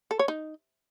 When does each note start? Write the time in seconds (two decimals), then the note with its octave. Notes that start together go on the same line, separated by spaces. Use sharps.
0.11 A4
0.19 C#5
0.28 D#4